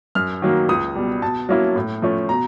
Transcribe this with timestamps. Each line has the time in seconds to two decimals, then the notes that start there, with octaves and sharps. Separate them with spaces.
0.15 F#2 F6
0.42 D#3 F#3 A#3
0.69 C#2 D#6
0.96 B2 G3
1.22 B2 A5
1.49 F#3 A#3 C#4 E4
1.76 A2
2.02 F3 A3 C#4
2.29 B2 A#5